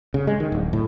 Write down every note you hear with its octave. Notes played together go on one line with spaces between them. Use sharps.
C#3
G#3
D#3
D1
A2